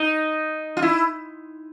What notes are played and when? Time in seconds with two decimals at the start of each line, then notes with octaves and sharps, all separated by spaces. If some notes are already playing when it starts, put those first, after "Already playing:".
Already playing: D#4
0.77 F4
0.82 E4